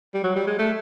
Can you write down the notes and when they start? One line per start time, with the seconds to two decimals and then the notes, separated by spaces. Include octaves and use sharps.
0.14 G3
0.24 F#3
0.36 G3
0.47 G#3
0.59 A3